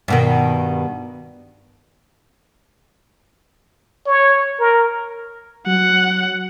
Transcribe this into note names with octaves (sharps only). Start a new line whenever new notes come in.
G2 B2 D#3
C#5
A#4
F#3 F#5